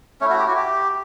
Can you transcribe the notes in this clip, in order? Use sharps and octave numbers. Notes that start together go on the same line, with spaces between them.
A3 C#4 E4 C#5
F#4
G4
F#4
G4